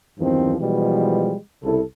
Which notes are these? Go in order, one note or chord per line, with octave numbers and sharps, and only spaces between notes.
E2 G2 D#3 F3 C4
B2 E3 F3 G3 G#3
C2 C#3 E4 A4